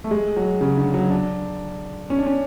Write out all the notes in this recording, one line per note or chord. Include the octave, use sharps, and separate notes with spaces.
A3
G#3
F#3
C#3
D3
F#3
D4
C#4
D4
C#4